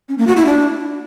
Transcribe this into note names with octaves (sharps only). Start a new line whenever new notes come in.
C#4
A#3
F#4
E4
D4